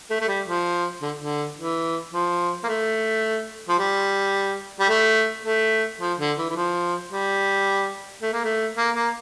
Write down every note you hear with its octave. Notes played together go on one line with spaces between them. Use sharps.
A3
A3
G3
F3
D3
D3
E3
F3
A#3
A3
F3
G3
G3
A3
A3
F3
D3
E3
E3
F3
G3
A3
A#3
A3
A#3
A#3